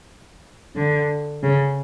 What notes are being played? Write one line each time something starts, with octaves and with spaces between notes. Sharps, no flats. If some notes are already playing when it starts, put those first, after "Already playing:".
D3
C#3